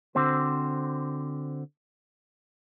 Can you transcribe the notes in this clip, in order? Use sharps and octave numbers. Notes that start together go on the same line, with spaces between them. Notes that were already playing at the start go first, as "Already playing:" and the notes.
D3 C4 F#4 C5